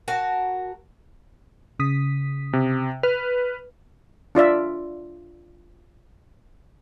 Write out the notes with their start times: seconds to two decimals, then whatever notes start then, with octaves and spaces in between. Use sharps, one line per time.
0.08 F#4 A#4 A5
1.79 C#3 D#6 B6
2.53 C3
3.03 B4 F6
4.35 D4 F4 D5 E5